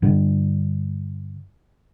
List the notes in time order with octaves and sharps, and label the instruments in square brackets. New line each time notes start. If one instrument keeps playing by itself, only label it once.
[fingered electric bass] G2 D3 G3